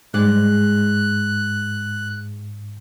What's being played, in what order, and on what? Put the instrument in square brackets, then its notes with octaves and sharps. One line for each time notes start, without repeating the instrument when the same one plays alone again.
[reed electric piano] G#2 [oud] G#3 D5 [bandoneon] F#6